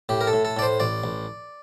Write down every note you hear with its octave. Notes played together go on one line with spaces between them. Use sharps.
A2 G4
A#4
A4
A2
A4
A2 D5
C5
A1 D5
A1